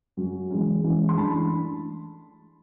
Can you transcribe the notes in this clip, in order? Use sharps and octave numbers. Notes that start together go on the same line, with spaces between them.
F#2 C#3 F#3
E3 G#3 C#4
E3 G#3 C#4
C6
E3 A3 D4 A5 B5